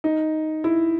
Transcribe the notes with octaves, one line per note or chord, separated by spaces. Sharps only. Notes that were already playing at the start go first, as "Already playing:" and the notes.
D#4
E4